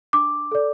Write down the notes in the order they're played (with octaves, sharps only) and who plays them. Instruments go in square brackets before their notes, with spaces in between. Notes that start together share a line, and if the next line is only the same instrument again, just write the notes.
[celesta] D4 D6
A4 D5